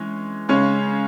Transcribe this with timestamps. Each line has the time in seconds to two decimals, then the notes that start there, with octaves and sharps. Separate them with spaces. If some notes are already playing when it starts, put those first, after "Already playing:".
Already playing: E3 G#3 C#4
0.49 C#3 G#3 C#4